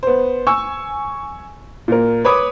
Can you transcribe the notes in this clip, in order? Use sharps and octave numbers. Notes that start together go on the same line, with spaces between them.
B3 C5
G#5 C#6 E6
A#2 A#4
B4 C#5 B5 D6 D#6